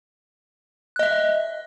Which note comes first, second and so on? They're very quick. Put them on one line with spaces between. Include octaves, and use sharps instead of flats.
F#6 D#5 E5